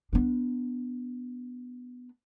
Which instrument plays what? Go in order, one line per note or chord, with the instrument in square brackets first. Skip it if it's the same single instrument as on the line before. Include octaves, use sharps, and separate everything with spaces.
[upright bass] B3 D4